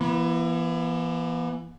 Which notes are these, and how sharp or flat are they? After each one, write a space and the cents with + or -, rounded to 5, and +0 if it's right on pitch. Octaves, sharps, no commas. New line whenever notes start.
E3 +25 B3 -40